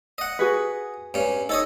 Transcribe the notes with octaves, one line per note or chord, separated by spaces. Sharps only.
D#5 F#5
F#4 G#4 B4
G2 C#4
D#4 A4 C#5 D#5